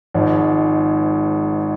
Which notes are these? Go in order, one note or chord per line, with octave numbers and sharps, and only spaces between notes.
G#1 G#2 F3